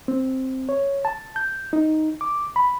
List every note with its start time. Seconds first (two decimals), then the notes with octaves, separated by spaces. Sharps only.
0.08 C4
0.69 C#5
1.05 A5
1.36 G6
1.73 D#4
2.21 D6
2.56 B5